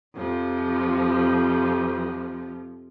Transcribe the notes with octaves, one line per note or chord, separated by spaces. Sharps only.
F2 C3 F3